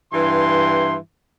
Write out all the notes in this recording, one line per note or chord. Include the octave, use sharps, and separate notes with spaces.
G2 E3 C6